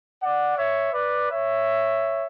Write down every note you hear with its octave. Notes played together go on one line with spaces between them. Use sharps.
D5 F#5
C#5 E5
B4 D5
C#5 E5